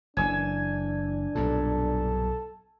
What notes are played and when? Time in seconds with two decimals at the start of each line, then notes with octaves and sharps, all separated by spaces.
0.17 F#1 E3 D4 G#5 E6
1.35 B1 G2 A#2 A4